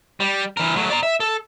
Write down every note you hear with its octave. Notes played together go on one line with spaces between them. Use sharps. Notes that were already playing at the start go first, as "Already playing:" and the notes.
G3
E3 A#4
F#3 A3
D5 A#5
E5
A4